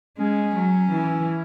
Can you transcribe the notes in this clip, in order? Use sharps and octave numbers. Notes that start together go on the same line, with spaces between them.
G#3 C#4
F#3
E3